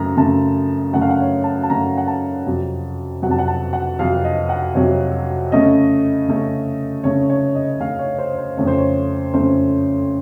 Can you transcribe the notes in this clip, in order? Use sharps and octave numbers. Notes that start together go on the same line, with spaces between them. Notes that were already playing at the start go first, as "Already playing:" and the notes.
Already playing: F#2 C#3 A3 A#5
F#2 C#3 A3 A5
F#2 C#3 A3 F#5
F5
F#5
C#5
A5
A5
F#2 C#3 A3 A#5
F#5
A5
F2 C3 F#3
F2 C3 F#3 F#5
A5
F#5
A5
F#5
F2 C3 F#3 F5
D#5
F#5
F2 C3 F#3 C#5
C#3 A3 C#4 D#5
C#3 A3 C#4
C#3 A3 C#4 C#5
C#5
D#5
C#3 A3 C#4 F5
C#5
C5
C5
F2 C#3 A3 C#4 C#5
C5
C#5
F2 C#3 A3 C#4 C5